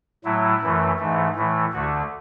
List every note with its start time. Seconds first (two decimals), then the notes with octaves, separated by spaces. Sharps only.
0.25 A2 F#3 A3 E4
0.62 F#2 E3 A3
0.99 G#2 E3 A3
1.36 A2 E3 A3
1.73 D2 D3 A3 F#4